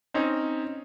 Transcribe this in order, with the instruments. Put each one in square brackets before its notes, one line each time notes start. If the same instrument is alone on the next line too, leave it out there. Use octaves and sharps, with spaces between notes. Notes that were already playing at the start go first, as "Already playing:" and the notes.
[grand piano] C4 C#4 D#4